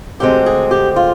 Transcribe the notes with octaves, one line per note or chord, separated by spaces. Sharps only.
D2 D3 G#3 C4 G4
G#4
G4
F4